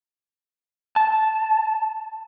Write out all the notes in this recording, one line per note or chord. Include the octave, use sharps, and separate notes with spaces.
A5